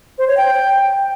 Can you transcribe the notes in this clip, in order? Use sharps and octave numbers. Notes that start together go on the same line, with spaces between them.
C5
C#5
G5